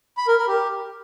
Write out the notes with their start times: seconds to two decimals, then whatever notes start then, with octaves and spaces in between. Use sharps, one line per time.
0.17 B5
0.28 A#4
0.38 A#4
0.48 G4